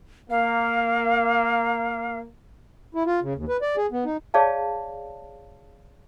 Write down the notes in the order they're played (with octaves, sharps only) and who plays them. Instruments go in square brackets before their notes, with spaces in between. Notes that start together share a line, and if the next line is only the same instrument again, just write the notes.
[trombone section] A#3 [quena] F5
[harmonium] E4
F4
C#3
D#2
B4
D5
G#4
B3
D#4
[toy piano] G#4 C#5 D5 F5 A5